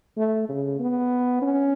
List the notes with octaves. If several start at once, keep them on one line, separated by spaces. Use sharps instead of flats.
A3
C#3
B3
C#4